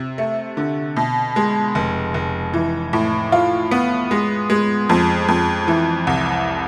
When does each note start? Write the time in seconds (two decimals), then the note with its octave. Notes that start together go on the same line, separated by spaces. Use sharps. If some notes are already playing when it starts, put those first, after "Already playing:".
Already playing: C3
0.18 A3
0.57 D3
0.97 B2
1.36 G#3
1.75 F1
2.14 F1
2.53 E3
2.93 A2
3.32 F4
3.71 B3
4.11 G#3
4.50 G#3
4.89 F2
5.28 F2
5.68 E3
6.07 C2